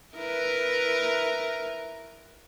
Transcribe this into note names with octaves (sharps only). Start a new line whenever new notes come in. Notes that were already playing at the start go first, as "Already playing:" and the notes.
E4 A#4 B4